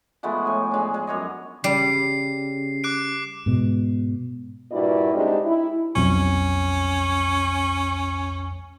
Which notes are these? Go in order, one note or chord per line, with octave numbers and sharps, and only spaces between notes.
F3 G#3 A3 B3
A2 G#5
G#3 D4
G#3
F#2 C#5 D#5
C#3 G3 C7
D6 F#6 D7
G#2 B2
G2 A#2 E4 F#4 D5
C3 G#3 D4 D#4 G4
E4
B1 F2 C#4